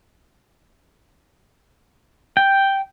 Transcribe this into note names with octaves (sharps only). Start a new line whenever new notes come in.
G5